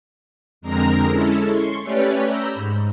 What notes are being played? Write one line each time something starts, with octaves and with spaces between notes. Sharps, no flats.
F2 D3 G#3 C4 A#4 A#5
G#3 C#4 E4 A4
C6 C#6
A3 C#4 G4 B4 C#5 D5
A#5 B5 E6 G6
G#2